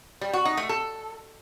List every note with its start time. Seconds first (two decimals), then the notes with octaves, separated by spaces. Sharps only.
0.21 G3
0.33 F#4
0.45 D#4
0.57 A3
0.69 A4